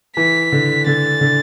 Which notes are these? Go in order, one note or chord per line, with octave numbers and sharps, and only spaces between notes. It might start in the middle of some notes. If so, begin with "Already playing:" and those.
E3 B6
D3
D3 A6
D3